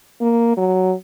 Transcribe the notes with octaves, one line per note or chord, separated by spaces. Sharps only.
A#3
F#3